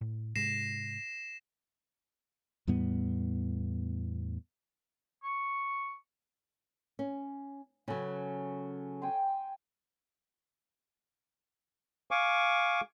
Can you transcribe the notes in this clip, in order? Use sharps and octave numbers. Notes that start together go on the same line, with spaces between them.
A2
G#2 C3 G#3 A#6 C7 E7
E2 A2 G3 B3
C#6
C#4
C#3 F#3 C#4 A4 B4
G5 G#5 C6
F5 G#5 C#6 D6